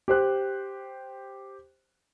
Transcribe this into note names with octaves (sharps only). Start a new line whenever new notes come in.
G4 C5 F#6